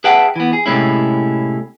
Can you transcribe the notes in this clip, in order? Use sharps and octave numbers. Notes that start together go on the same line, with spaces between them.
G#4 B4 E5 F#5 G5 A5
E3 B3
G#4
A2 C3 G#3 C#4 E4